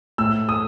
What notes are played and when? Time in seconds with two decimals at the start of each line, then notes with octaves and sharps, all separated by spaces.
0.18 A2 E6
0.49 D#6